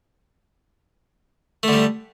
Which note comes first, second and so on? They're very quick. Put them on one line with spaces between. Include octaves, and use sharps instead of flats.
A3 D3 G3